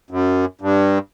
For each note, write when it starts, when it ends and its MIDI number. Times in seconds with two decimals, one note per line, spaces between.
0.11 0.45 42
0.61 0.98 43